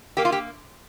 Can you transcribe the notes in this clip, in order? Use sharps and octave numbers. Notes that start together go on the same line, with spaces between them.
A#3 G4
F4
G4